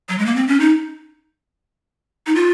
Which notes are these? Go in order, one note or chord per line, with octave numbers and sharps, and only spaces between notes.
F#3
G#3
A#3
C4
C#4
D#4
D#4
F4